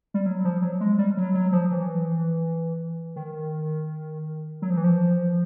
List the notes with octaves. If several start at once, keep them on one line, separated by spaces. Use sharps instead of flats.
G3
F#3
F3
F#3
G#3
G3
F#3
F#3
F3
E3
D#3
F#3
F3
E3
F3